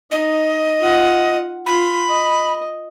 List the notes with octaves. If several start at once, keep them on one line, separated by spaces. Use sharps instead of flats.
D#4 D#5
F4 F#5
F4 B5 C6
D#5